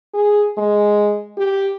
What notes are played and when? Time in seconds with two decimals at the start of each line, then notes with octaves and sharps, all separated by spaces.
0.14 G#4
0.57 G#3
1.38 G4